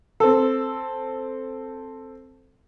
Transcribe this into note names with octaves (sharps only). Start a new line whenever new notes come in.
C4 A4